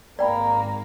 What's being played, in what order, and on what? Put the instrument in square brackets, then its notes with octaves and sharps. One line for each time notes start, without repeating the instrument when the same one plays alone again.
[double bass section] G#1 [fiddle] A#3 [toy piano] D5 G5 B5 [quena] A#5